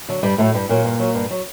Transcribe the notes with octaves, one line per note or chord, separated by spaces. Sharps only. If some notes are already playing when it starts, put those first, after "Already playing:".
D3 F#3
G2 G3
A2 F#3 A3
G2 G3
A#2 F#3 A#3
G2
F#3
G2
F#3